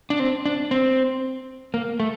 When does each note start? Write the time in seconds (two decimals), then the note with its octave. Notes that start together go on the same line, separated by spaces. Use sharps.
0.10 D4
0.20 C4
0.46 D4
0.71 C4
1.74 A#3
2.00 A3